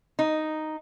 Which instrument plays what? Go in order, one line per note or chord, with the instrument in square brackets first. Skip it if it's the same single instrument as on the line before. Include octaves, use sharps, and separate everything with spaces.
[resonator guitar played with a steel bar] D#4